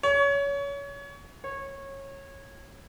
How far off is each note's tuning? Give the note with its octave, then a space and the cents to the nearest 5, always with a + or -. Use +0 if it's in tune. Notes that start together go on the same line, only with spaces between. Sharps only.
C#5 +25
C#5 -20